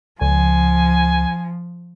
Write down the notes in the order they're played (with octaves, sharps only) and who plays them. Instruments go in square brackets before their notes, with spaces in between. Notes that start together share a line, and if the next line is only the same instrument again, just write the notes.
[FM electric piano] C#2 [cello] F3 [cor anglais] G#5